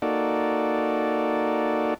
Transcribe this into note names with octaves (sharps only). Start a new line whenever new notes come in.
A#3 D#4 F#4 A4 D5